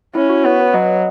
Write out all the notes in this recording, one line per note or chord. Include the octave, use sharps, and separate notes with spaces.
C#4 E4
F#4
B3 C#5
B4
F#3 D#5